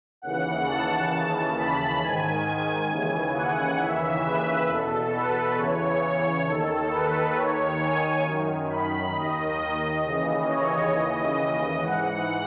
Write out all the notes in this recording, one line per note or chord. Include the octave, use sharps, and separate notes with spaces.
D#2 C#3 E3 F#5
A5
D#2 C#3 E3
B5
G#2 D#3 G#5
D#2 C#3 E3
F#5
D#2 C#3 E3 E5
B4
E2 B2 A4
B4
E2 C#3 E3 C#5
C#5
D#2 D#3 A4
B4
D#2 D#3 C#5
G#5
F#2 D#3
B5
D#2 D#3 D#5
D#2 C#3 E3
C#5
D#2 C#3 E3 D#5
D#5
G#2 E3 F#5